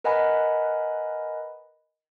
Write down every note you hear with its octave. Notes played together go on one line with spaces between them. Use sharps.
A#4 B4 D#5 F#5 G#5 B5